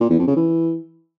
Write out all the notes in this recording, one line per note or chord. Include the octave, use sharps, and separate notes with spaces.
A#2
E2
F2
C#3
E3